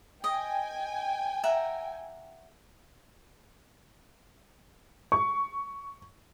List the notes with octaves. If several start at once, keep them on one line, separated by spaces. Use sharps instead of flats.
D#5 G5 G#5
E5 F#5 A#5
C#6